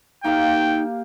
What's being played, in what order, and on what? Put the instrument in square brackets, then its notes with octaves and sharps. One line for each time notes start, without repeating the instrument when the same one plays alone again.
[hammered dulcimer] A#3 G4 F5 [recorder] D#4 [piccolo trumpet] G5